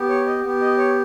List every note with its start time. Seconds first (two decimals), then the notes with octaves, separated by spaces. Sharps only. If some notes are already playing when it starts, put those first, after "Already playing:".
Already playing: B3 G4
0.09 C#5
0.26 D#5
0.44 B3 G4
0.61 D#5
0.78 C#5